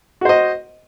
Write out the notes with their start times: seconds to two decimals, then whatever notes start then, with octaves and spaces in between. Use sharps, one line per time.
0.21 F#4
0.25 C5
0.29 D#5